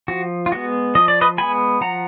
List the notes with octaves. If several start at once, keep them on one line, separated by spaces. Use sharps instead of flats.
F3 F#4
F4
G#3 B3 F#4
F3 D#5
D5
B4 D#5
G#3 B3 G#5 B5
F3 F#5 A#5